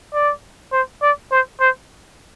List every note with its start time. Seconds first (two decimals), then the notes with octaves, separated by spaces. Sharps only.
0.14 D5
0.72 C5
1.02 D5
1.32 C5
1.61 C5